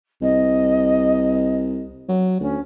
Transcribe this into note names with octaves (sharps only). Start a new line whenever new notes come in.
C2 D#5
F#3
D2 C#4